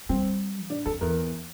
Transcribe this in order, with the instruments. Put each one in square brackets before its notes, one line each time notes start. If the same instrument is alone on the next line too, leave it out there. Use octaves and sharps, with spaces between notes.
[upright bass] G3 [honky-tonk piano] C4
[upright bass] A2 [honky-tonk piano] D4
[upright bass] F2 [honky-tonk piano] A4
[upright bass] E2 [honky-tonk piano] A#4